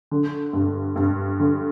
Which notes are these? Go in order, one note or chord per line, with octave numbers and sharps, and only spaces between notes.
D3
G2
G2
D3